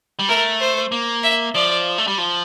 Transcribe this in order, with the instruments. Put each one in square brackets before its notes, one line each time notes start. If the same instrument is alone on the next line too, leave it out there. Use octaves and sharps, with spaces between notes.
[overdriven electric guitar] G3
[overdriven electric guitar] A3 [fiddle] A#4
[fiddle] C5
[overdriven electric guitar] A#3
[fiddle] E5
[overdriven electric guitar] F3 [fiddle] D5
[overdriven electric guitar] A3
G3
F3